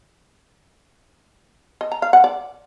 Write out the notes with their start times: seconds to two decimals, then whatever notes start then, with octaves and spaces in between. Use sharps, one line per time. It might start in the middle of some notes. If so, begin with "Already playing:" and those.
1.81 D#5
1.92 A#5
2.02 F5
2.13 F#5
2.24 D5